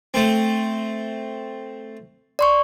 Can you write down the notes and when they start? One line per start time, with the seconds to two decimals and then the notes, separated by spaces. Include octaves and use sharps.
0.14 A3 C4
2.39 D5 C6 C#6